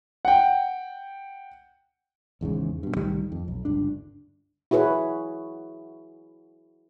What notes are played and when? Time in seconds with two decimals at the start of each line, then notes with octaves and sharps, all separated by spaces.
0.25 F#5 G5
2.41 G#1 E2 G#2 C#3
2.83 G2 B2
2.96 C2 A2 D#3 G3
3.32 F2
3.48 B1
3.65 G1 C#2 G2 D4
4.71 E4 F#4 G#4 B4 C#5